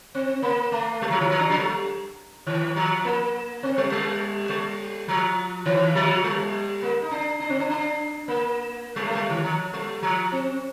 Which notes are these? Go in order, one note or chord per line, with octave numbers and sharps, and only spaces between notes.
C4
A#3
A3
G3
F3
D#3
F3
D4
F3
G3
D#3
F3
A#3
C4
G3
G3
G3
F3
D#3
F3
G3
A#3
D#4
D4
D4
C4
D4
D4
A#3
G3
A3
G3
D#3
F3
G3
F3
C4